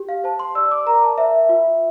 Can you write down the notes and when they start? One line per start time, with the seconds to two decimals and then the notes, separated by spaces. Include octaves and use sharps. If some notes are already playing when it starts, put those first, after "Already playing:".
Already playing: G4
0.09 F5
0.24 C5 A5
0.39 C6
0.55 D5 E6
0.71 D6
0.86 A#4 A#5
1.03 A5
1.18 C5 E5
1.49 F4